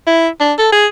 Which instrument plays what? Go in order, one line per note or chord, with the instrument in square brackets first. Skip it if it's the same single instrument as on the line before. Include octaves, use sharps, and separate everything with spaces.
[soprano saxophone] E4
D4
A4
G#4